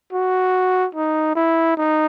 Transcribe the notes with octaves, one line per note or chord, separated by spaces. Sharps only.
F#4
D#4
E4
D#4